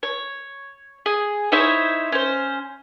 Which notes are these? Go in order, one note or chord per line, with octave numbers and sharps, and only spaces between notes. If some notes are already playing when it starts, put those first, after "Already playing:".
C#5
G#4
D#4 E4 C5 C#5
C#4 C5